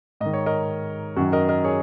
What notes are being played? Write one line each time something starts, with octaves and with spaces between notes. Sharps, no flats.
G#2 D#3 D#5
C#5
A#4 D#5
F#2 D#3 C#4 F#4
A#4 D#5
A#4 D#5
G#4 C#5